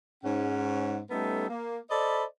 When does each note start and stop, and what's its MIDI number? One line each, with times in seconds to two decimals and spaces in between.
0.23 0.99 44
0.23 0.99 61
0.23 0.99 78
1.10 1.47 55
1.10 1.47 57
1.10 1.47 59
1.10 1.47 61
1.10 1.47 63
1.10 1.47 69
1.49 1.78 58
1.90 2.24 69
1.90 2.24 72
1.90 2.24 74
1.90 2.24 75
1.90 2.24 83